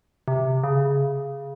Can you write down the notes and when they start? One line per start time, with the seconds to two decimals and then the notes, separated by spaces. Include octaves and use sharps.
0.28 C3
0.64 C#3